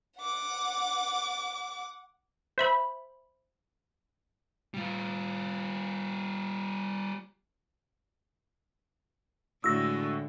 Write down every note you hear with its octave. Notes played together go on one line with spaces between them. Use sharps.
F#5 D6
C5 E5 B5
G3 F4
A2 D3 G#3 F#4 E6 A#6